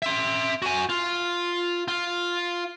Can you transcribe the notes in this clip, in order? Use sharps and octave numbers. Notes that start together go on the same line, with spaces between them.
E5 C6
F#4 G#5
F4
F4